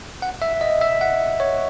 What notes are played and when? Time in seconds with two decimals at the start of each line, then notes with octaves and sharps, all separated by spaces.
0.22 F#5
0.42 E5
0.61 D#5
0.81 E5
1.01 F#5
1.40 C#5